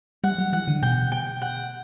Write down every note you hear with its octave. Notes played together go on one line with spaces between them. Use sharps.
G3 F#5
F#3
E3 F#5
D3
B2 G5
G5
F#5